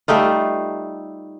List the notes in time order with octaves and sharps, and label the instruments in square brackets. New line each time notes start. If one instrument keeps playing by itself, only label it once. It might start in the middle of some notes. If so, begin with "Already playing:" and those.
[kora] G3 A3 D#4 F4